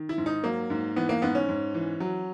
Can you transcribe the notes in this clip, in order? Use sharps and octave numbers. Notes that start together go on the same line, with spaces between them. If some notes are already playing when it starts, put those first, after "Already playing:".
Already playing: D#3
E4
G#2
D#4
F#3 A#3
G#2
E3 B3
A#3
G#2 B3
C#4
G#2
E3
F#3